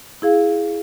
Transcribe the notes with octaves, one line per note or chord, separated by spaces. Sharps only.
E4 G#4 F5